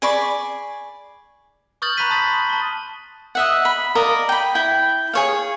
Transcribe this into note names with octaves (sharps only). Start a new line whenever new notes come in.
G#4 D5 B5 C#6
C#6 D#6 F6 G6 A6 F#7
A#5 B5 C#6 F#6 B6 D#7
A5 C6 D#6 A6
D#6
A5 G7
D#5 E5 F#5
B5
A#4 D5 D#5 F5
G5 B5
E4 G5
G#4 C#5 F5